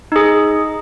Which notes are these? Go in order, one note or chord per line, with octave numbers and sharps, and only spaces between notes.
D#4 G#4